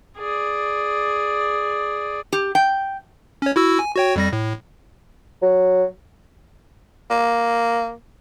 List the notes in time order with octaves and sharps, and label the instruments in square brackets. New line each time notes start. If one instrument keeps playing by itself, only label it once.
[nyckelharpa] G#4 D5
[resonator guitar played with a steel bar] G4
G5
[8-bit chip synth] C#4 C#5
E4 F#4 E6
G#5
F#4 C#5 G5
F2 G3 A#6
A2
[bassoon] F#3
[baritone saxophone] A#3